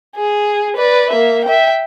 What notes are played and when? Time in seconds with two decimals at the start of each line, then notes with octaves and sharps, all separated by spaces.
0.16 G#4
0.77 B4 D5
1.10 A#3 E5
1.45 E5 G5